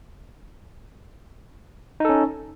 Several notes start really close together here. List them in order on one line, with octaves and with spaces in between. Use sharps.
D#4 A4 C#4